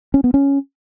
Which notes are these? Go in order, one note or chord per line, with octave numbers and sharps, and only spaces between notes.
C#4
B3
C#4